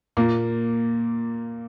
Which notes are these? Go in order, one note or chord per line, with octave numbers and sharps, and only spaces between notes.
A#2 A#3